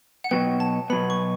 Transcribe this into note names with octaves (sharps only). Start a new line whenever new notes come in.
F#5
B2 F#3 B3 G5
A5
B2 F#3 B3 B5
C#6